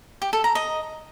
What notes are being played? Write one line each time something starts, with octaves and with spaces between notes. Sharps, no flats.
G4
A4
A#5
D#5